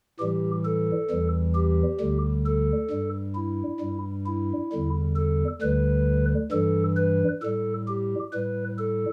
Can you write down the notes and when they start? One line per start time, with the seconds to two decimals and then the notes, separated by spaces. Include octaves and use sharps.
0.19 A2 E3 G3 G4
0.65 A4
1.10 E2 E3 G3
1.55 G4
1.99 D2 D3 G3
2.46 A4
2.90 G2 G3
3.35 E4
3.80 G2 G3
4.27 E4
4.72 E2 D3 G3
5.16 A4
5.61 D2 D3 G3 B4
6.51 G2 E3 G3 A4
6.97 B4
7.42 A2 G3 A4
7.88 G4
8.33 A2 G3 B4
8.78 A4